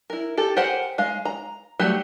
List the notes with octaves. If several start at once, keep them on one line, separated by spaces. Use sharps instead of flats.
E4 A#4
G4 A4
G4 G#4 A#4 C5 F#5
G#3 F5
A#5
F#3 G3 A3 G4